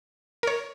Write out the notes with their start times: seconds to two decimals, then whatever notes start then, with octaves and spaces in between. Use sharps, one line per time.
0.43 A#4
0.47 C#5